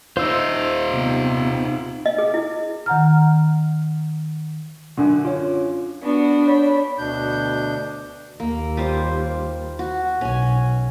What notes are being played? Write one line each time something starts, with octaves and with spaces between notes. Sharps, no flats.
D#4 F4 C5 E6
C3 B3
D#5
G#4
E4
D#3 F#5 A#5 F6
F#2 D3
F4 C#5
B3 D4 F#4
C#5 B5
D2 B2 D4 G6
D#2 A#3
G3 F4 C5
F#4
B1 C#4 G#5